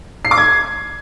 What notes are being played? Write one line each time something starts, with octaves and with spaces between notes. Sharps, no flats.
C7
D6
G#6